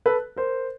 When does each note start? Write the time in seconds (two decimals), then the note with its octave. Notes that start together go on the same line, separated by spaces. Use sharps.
0.06 A4 B4
0.36 A#4 C5